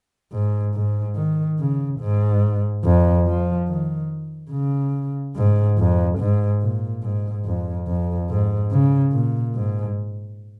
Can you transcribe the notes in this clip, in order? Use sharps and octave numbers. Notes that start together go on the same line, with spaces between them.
G#2
G#2
D#3
C#3
G#2
F2
F3
D#3
C#3
G#2
F2
G#2
A#2
G#2
F2
F2
G#2
C#3
A#2
G#2